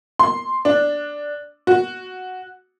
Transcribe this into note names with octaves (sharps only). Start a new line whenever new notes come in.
C6
D4
F#4